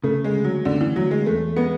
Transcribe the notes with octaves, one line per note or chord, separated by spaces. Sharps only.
C#3 A3
G#3
D2
F#3
D2 D3
E3
D2 F#3
G#3
E2 A3
G#3 B3